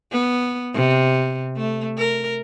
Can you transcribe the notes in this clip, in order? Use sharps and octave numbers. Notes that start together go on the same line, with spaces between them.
B3
C3
A3
A#4